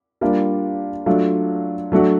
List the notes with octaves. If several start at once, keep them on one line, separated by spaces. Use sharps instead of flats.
G3 A#3 D4 F4
F#3 A3 D4 F4
F#3 A3 D4 F#4